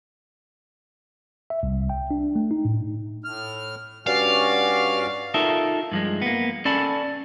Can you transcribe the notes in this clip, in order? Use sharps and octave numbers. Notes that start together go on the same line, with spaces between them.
E5
C2
G5
D4
A3
D#4
A2
A2 F6
G2 C#4 F#4 D5 F5
D#4 F4 A4 A#4 E5
G2 F3 G#3
A#3 B3
C#4 A4 D5 A5 B5